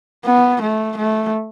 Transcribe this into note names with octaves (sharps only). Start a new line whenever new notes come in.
B3
A3
A3